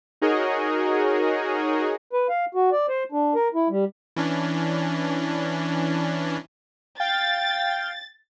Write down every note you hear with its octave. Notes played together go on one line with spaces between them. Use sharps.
D#4 F#4 G#4 A#4 C#5 D#5
B4
F5
F#4
D5
C5
D4
A#4
E4
G3
E3 C#4 D4
F5 G5 A6